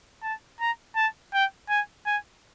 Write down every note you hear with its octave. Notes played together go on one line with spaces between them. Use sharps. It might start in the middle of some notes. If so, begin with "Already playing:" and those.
A5
A#5
A5
G5
G#5
G#5